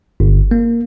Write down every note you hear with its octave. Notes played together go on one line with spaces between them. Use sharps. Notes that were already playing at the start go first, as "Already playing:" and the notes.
G1
A#3